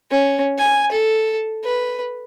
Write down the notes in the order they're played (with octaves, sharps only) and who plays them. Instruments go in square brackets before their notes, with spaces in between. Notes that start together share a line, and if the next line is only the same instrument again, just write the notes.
[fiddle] C#4
G#5
A4
B4